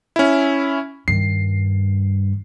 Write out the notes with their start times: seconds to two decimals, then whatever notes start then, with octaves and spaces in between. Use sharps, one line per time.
0.16 C#4 E4
1.08 G2 D#3 C7